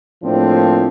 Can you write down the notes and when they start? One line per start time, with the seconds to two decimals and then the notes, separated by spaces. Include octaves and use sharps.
0.23 A2 F3 A#3 C4 D4 E4